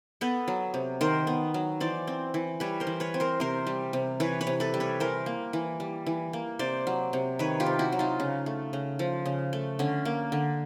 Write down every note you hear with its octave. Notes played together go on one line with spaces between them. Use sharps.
B3 A4 B4
F#3
C3
D#3 A#4 C5
B3
F#3
E3 C5 D5
C4
E3
G3 B4 C#5
A#4 C5
E3
B4 C#5
C4
A#4 C5
C3 A#4 C5
G3
C3
E3 B4 C#5
B4 C#5
C3
A4 B4
G3
B4 C#5
E3 A#4 C5
A#3
E3
G3
E3
A#3
C3 C5 D5
F#3
C3
D#3 B4 C#5
F4 G4
C3
E4 F#4
F#3
D#4 F4
C#3
A3
C#3
F3
C#3
A3
D3 C#4
A#3
D3